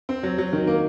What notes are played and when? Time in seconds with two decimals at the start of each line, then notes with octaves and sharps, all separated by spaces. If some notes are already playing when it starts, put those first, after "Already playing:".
0.09 C4
0.23 F#3
0.38 F#3
0.53 D#3
0.67 A#3